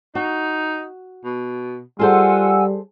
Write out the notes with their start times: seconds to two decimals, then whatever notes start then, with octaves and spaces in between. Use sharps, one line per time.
0.15 D#4 F#4
1.25 B2
1.99 G3 F4 G#4 A4 C5 F#5 G#5 E6